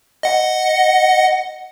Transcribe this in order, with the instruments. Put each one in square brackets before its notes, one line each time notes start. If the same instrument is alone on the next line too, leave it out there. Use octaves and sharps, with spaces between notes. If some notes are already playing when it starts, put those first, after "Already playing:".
[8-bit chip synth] D#5 F#5